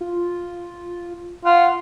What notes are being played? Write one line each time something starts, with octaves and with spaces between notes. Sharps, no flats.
F4
F4 F#5